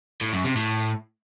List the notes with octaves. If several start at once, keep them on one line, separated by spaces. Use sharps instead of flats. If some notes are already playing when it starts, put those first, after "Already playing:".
A2
F#2
C3
A2